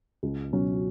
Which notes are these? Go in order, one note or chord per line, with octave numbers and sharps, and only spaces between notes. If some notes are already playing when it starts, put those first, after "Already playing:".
C#2
B2 F#3 C#4 F#4